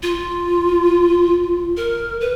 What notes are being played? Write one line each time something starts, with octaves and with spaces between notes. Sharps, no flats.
F4
A#4
B4